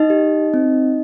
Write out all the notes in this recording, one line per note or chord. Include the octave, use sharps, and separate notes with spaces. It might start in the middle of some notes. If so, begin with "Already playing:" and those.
Already playing: D#4 D#5
G4
C4